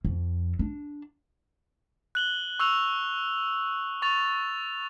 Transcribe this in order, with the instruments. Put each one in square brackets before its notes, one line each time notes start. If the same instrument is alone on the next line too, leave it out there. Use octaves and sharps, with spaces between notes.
[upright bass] F2
D4
[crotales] F#6 F#7 G7
C#6 E6 F#6 F7
C#6 A6 F7